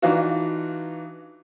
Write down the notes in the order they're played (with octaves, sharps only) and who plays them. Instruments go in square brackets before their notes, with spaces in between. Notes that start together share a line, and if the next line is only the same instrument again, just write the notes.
[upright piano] E3 D4 D#4 F4 F#4